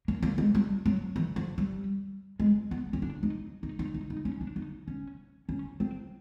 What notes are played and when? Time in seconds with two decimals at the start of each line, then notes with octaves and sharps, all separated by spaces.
0.08 A#3
0.23 A#3
0.38 G#3
0.55 G3
0.86 F#3
1.16 E3
1.36 F3
1.58 G3
2.40 G#3
2.71 B3
2.93 C#4
3.02 D4
3.23 D#4
3.63 D#4
3.79 D#4
3.94 D#4
4.10 D#4
4.25 C#4
4.41 D4
4.56 D#4
4.88 C#4
5.49 C#4
5.80 C4